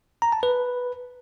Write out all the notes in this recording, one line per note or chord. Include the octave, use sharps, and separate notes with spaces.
A#5
A5
B4